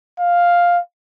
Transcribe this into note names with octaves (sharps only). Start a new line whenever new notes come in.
F5